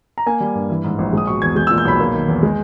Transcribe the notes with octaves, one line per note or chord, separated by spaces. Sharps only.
A#5
A#3 G#5
G3
G2
E3
G#2
A#1
G#3 D#6
B2 C#6
E2 G#6
G#3 G6
E6
A#2
G6
B1 B5
A#3
D#3
E2
G#3